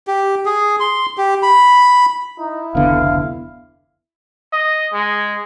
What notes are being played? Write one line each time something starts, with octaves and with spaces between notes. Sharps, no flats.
G4
G#4
C6
G4
B5
D#4 E4
F1 C#2 D3 B3 F5
D#5
G#3